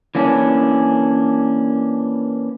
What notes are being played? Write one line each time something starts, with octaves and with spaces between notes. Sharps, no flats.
E3 A#3 C#4 D4